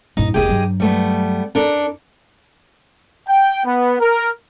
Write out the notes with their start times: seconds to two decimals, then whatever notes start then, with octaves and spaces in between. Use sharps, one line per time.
0.17 G2 A#2 D#4
0.34 F1 D#2 G4 G#4 D#5
0.49 G2 F#3
0.80 G3 A3 B3
1.55 F#2 D4 A4 A#4
3.28 G5
3.65 B3
4.00 A#4